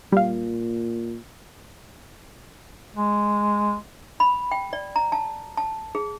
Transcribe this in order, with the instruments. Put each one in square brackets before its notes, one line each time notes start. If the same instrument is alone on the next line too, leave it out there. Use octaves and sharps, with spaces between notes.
[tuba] A#2 [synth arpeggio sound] G3 F5
[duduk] G#3
[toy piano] B5
G5
D5
A#5
A5
A5
G#4